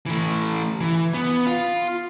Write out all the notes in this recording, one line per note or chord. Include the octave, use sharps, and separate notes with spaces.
E3 A3
E3
B3
F4